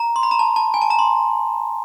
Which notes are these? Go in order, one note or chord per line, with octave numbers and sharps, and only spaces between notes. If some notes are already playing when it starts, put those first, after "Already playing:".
Already playing: A#5
C6
B5
A#5
A5
A5
G#5
A5
A#5
C6